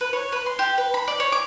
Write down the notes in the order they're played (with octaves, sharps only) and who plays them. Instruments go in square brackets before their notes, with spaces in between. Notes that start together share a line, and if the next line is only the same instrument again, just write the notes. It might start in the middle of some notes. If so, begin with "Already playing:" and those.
[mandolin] B4
C#5
B4
C6
G4
B4
B5
D5
C#5
D6